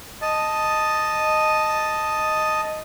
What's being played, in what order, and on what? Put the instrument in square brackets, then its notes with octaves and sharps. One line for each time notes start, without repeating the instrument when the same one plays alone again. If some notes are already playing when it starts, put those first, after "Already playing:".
[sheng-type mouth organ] D#5 A5